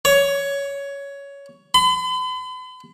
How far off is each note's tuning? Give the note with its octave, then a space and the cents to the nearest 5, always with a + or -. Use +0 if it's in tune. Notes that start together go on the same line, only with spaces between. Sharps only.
C#5 +15
B5 +45